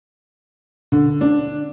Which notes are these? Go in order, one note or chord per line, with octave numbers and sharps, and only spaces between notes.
D3
D4